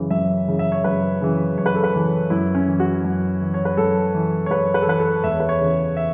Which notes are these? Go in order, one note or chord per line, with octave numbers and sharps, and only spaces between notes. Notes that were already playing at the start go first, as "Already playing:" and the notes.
Already playing: F#2 C#3 E3
F#2 E5
C#3 E3
E5
C#5
F#2 B4
C#3 E3
F#2 C#5
B4
A4
B4
C#3 E3
F#2 E4
C#4
E3
F#4
F#2
E3
C#5
B4
F#2 A4
E3
C#5
F#2 B4
B4
A4
E3 B4
A4
E2 E5
C#5
B4
C#5
C#3 E3
E5